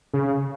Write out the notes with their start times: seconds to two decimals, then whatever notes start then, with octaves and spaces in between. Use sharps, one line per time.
0.13 C#3